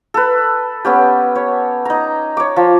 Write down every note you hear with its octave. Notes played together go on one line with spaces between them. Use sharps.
A4 B4
B3 C#4 G4
C#5
D#4 A#5
C#5 D6
F3